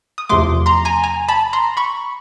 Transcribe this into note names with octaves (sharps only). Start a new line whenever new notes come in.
D#6
E2 C3 F3 A3 C6 D6
A#5 C6
G#5 A#5
G#5 A#5
A5 B5
A#5 C6
B5 C#6